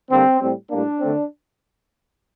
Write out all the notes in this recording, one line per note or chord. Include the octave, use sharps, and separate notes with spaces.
D3 G3 A#3 C4
A2 G3 C4
A2 G3 A#3 D4
D3 A3 C4